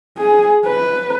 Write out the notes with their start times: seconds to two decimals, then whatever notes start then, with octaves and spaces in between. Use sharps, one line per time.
0.18 G#4
0.66 B4